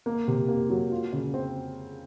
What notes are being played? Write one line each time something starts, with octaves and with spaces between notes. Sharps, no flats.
A#3
C3
A#3
F#3
F4
C#3
C4